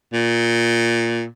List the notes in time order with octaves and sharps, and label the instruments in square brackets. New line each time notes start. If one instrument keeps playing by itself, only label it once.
[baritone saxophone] A#2